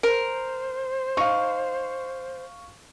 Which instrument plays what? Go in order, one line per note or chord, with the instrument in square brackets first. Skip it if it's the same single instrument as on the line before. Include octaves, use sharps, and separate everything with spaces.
[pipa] A#4 [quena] C5
[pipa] D#4 [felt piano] F5 C#6